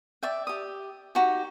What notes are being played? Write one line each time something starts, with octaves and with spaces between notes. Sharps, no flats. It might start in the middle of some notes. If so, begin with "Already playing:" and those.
D5 E5 G5
G4 D#6
D#4 F#4 G4